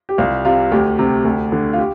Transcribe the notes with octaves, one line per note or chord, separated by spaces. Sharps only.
G4
C2 F4
C3 F4
D2 G4
C3
D2
D3
F4
G4